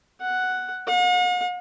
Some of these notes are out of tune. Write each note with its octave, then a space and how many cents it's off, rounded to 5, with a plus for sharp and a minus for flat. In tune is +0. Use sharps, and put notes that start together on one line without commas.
F#5 +5
F#5 -45